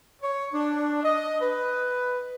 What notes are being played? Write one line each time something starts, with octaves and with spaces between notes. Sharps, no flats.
C#5
D4
D#5
B4